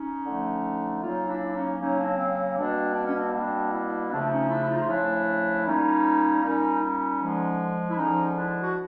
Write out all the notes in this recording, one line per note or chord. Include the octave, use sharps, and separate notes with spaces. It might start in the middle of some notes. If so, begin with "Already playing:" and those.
Already playing: C#4 D#4
D3 F3 A3
C#3 F#3 A#3 D#4 F4
D4 E4
C#4 D#4
C#3 F#3 A#3 C#4 D#4
C4 D4
C4
C4
B2 G3 A#3 C4 D4
D4
C#4
C4 D4
B2 G3 A#3 C4 D4
D4 E4
C#3 F3 A3 C4 D4
D4
C#4 D#4
D4 E4
E4
D#4 F4
F4
C#3 F3 A3 D4 E4
A#2 G3 A#3 C#4 D#4
A#2 G3 A#3 C#4 D#4
C#4 D#4
D3 F3 G#3
E4
D3 F3 G#3 C#4 D#4
D#4
D4 E4
F#4